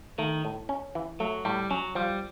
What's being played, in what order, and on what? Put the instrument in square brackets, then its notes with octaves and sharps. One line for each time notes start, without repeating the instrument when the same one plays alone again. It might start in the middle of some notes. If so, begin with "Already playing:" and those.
[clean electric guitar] D#3 [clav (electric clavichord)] A3
[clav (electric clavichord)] A2
C#4
E3
[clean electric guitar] F#3 [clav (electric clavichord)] A3
[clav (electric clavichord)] A2 [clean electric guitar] G3
[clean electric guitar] F#3 [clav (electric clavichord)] C#4
[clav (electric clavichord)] F3 [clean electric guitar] G3